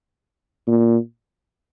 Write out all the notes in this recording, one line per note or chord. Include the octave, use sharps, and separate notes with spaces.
A#2